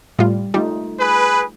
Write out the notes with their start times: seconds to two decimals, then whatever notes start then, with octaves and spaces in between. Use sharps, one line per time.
0.19 A2 G3 F4
0.54 G3 A3 D#4 F4
1.00 G#4 B4